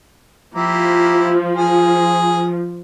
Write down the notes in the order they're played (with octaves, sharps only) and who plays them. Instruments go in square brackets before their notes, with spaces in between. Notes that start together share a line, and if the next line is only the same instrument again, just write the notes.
[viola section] F3 [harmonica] A#3 E4 G4
[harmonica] G#4